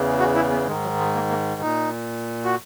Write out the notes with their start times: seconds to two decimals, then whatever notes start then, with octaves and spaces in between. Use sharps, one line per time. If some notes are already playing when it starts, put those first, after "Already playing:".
Already playing: E2 C#3 E3
0.19 F#4
0.36 E4
0.51 B3
0.67 G#2 D#3 G#3
0.83 F#3
0.98 G#3
1.15 A#3
1.29 A#3
1.61 A#2 D#4
2.45 F#4